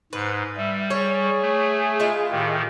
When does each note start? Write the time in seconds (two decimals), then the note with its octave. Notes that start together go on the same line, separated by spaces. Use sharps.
0.13 G#2 B4
0.57 G3 E5
0.90 G#4 C#5
1.42 A3
2.00 G#3 E4 F4
2.31 A2 D#3 G4